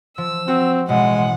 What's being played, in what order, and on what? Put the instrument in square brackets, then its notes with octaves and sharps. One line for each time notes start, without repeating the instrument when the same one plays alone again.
[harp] F3 [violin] E6
[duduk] C4 [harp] F#4
[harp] A1 B2 [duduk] G#3 [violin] F#5